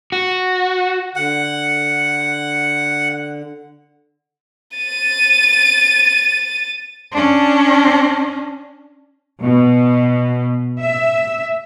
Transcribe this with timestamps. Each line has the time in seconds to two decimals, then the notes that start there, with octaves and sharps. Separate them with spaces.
0.12 F#4
1.16 D3 F#5
4.77 A6 D#7
7.12 C#4 D4
9.39 B2
10.81 E5